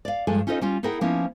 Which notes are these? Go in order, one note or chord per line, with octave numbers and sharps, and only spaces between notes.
D5 F5
G2 F3 G#3 G#4 A4 G#5
C#4 D#4 F4 A4 C5 D#5
G3 C#4 F4
D#4 E4 G#4 A#4 F#5 G5
F3 A#3 B3 C#4 D#4 E4